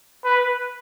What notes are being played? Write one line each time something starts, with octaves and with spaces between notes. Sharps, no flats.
B4